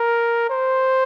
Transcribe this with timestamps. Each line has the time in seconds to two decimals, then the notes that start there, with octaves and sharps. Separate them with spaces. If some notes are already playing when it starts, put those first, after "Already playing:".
Already playing: A#4
0.49 C5